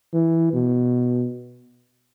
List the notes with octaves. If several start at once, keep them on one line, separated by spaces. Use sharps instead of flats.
E3
B2